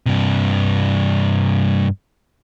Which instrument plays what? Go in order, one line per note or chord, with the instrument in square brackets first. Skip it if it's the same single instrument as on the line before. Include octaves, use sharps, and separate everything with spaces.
[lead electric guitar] G2 C3